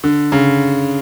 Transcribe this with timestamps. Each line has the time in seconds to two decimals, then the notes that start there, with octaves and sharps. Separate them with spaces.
0.04 D3
0.32 C#3